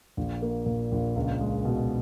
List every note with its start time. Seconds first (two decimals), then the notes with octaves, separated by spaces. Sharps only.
0.17 A#1
0.42 A#3
0.66 A#2
0.92 A#1
1.16 C#2
1.41 G#3
1.65 B2